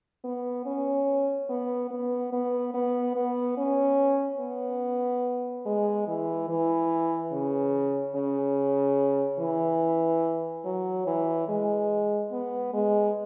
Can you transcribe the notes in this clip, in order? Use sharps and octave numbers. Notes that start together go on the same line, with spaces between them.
B3
C#4
B3
B3
B3
B3
B3
C#4
B3
G#3
E3
E3
C#3
C#3
E3
F#3
E3
G#3
B3
G#3